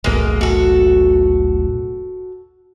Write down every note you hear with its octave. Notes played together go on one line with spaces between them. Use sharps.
E1 B1 A2 G#3 A#3
F#4 A4